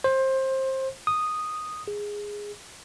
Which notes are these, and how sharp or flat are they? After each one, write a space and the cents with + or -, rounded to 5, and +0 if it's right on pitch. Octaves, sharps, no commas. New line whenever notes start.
C5 +20
D#6 -5
G#4 -10